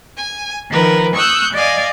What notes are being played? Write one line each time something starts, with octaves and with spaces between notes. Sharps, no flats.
G#5
D#3 F3 A#4 B4
C#6 D#6 E6 F#6 G6
D5 D#5 F5 G#5